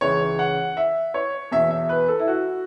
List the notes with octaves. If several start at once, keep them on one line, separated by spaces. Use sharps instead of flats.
C#2 C#3 E3 C#5
F#5
E5
C#5
E2 B2 E5
E5
B4
A4
E4
F#4